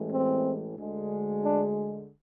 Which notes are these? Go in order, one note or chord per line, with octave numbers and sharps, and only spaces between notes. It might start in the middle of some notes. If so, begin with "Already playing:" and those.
Already playing: A1 A2 E3 G#3
C4
D2 D3 G#3
D4